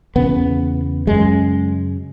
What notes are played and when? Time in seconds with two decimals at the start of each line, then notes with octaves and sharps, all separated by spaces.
0.16 E2 C#3 B3
1.07 F#2 C#3 G#3